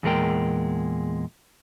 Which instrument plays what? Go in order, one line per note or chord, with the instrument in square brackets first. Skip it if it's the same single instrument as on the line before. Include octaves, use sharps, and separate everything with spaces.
[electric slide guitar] E2 A#2 G#3 A#4 G5